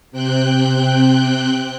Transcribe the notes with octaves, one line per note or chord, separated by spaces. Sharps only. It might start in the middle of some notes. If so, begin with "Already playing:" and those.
C3 C4 G5 F#6 G6